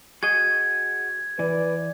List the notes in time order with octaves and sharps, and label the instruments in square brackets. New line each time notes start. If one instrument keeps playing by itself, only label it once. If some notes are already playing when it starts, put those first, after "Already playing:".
[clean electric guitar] F#4 G#4 D#5 [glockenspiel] G#6
[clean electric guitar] E3 [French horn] B4 [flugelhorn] D5